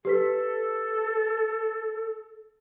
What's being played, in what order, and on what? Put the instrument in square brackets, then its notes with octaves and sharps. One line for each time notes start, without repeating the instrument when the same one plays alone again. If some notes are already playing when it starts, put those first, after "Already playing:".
[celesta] G4 B4 B6 [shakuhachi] A4